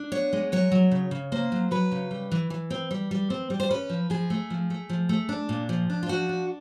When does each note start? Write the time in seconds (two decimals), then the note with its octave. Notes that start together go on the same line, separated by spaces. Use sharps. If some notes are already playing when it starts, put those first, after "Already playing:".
Already playing: D4
0.12 B3 C#5
0.33 G#3
0.52 F#3 C#5
0.72 F#3
0.92 C#3
1.11 C#3
1.32 A#3 C5
1.52 F#3
1.71 F#3 B4
1.92 C#3
2.11 G3
2.31 E3
2.50 E3
2.70 C4
2.91 G3
3.11 G3
3.30 C4
3.50 G3
3.60 C5
3.70 C#4 B4
3.90 F3
4.10 F3 G#4
4.30 A3
4.50 F3
4.70 A3
4.89 F3
5.09 A3
5.29 D4
5.49 A#2
5.69 F3
5.90 D4
6.03 F4
6.08 F3 F#4
6.29 D4